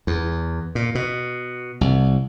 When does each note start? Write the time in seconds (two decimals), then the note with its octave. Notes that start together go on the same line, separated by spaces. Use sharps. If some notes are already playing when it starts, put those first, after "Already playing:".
0.07 E2
0.75 A#2
0.95 B2
1.81 C2